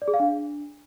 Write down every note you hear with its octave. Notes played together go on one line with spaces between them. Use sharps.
D5
G#4
F5
D4